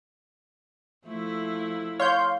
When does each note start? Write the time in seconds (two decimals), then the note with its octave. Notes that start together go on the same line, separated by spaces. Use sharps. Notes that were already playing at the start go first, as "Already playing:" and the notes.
1.06 F3 A3 E4
2.00 C#5 F5 C6 G6